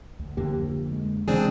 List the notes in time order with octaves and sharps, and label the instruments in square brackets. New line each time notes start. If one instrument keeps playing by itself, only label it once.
[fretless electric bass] D2
[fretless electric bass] F2 D3 A#3 [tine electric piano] G4
[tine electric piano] F3
G#3
[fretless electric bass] C#3 E3 [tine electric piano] F3 G#3 [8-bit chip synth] C4 D4 G#4